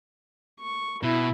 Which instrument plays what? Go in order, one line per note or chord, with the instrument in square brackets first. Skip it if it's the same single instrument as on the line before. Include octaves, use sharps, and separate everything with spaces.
[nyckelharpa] C#6
[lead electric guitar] B2 [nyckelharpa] E4